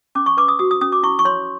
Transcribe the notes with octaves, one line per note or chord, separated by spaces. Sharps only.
C#4 D6
C#6
B4 D6
D#6
F#4 D#6
D#6
C#4 D#6
D6
E4 C#6
C#6
C#5 C6